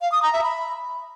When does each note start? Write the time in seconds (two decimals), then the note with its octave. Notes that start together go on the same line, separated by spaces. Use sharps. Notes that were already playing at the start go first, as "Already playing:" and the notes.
0.01 F5
0.12 D#6
0.23 A#5
0.33 E5
0.44 B5